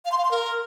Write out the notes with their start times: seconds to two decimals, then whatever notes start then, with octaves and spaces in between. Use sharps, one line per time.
0.05 F5
0.12 C6
0.18 F5
0.25 C6
0.31 A#4